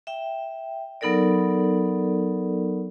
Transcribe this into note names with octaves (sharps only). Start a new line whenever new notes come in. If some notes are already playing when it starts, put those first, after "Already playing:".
E5 G5
F#3 B3 D#4 A4 A#4 D5